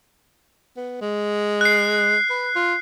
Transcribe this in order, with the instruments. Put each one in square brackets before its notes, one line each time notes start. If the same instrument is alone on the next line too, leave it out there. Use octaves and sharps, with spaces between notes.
[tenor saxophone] B3
G#3
[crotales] F#6 C7
[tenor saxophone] B4
F4